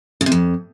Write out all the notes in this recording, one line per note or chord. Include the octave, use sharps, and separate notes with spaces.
C#3
C3
F2